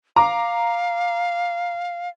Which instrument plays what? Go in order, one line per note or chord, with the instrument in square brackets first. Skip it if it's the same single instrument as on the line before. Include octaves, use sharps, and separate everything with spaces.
[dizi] F5 [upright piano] A#5 D6